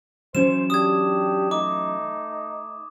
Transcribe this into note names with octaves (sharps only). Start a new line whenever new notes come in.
E3 F#3 C#4 C5 E7
D4 G4 D#6 G#6
A3 D#4 D6